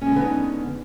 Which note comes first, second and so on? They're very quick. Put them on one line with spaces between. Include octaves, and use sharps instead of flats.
C#4 G#3 D3 B3 D#4